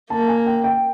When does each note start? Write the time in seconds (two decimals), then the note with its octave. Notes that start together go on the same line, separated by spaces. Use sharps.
0.10 A#3 A5
0.28 G#5
0.46 G5
0.64 G5